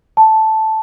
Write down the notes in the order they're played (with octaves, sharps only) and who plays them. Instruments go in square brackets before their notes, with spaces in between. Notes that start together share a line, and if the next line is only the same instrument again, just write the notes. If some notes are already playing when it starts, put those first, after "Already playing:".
[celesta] A5